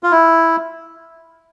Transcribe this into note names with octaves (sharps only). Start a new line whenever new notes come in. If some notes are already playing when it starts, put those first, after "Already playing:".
F4
E4